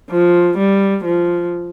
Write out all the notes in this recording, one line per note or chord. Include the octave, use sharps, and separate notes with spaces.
F3
G3
F3